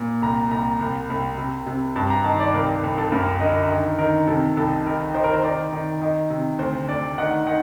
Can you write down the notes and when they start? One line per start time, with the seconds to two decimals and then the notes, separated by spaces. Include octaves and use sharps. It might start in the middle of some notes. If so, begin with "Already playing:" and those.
Already playing: A#2
0.22 C2 A#5
0.51 C2 A#5
0.81 C2
1.10 C2
1.38 C3
1.66 C3
1.96 G2 A5
2.10 A#5
2.24 D#3 A5
2.40 D5
2.54 C2 A#4
2.84 C2
2.98 A4
3.12 F#2 A#4
3.40 D3 D#5
3.70 D#3
3.98 D#3 A#4
4.27 C3 A4
4.57 C2 A4
4.86 D#3 A#4
5.14 D#3 C5
5.24 A#4
5.33 C5
5.43 D#3 D5
5.73 D#3
6.02 D#3
6.30 C3
6.59 D2 C5
6.88 D2 D5
7.18 D#3 F#5
7.47 D#3 F#5